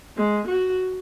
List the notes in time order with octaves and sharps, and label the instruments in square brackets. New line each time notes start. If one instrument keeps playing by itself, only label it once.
[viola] G#3
F#4